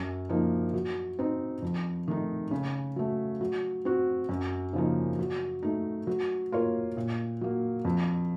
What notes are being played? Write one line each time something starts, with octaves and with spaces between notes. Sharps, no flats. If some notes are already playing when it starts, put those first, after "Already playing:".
Already playing: F#2
F3 A#3 D#4
F#3
C4 D#4
F2
D#3 A3 D#4
C#3
F#3 A3
F#3
C4 F#4
F#2
C#3 F3 A#3 D#4
F#3
A3 D#4
F#3
A#3 F4 A#4 C#5
A#2
F#3 A#3
F2